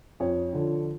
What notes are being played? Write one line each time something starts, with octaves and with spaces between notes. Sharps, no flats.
F2 C#5
D3 F3